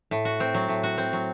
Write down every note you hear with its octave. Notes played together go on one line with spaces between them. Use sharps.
A2
F#4
C4
F#3
A2
F#4
C4
F#3